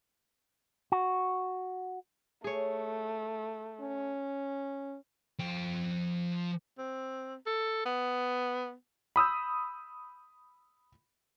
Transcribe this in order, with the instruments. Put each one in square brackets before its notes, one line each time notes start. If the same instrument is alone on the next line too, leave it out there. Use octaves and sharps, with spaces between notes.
[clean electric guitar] F#4
[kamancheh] A3 [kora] G#4 C#5
[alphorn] C#4
[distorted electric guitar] F3 G5
[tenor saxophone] C4
A4
B3
[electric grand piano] B5 D#6 E6 G6